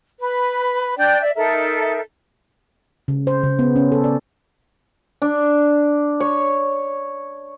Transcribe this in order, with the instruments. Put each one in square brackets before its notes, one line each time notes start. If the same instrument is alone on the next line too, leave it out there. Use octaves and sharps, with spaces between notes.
[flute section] B4
D4 D5 G5 G6
D5 E5
D#4 A4 A#4 E5
[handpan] C#3
C5
C#3
B3
C#4
A4
D5
[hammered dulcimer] D4
C#5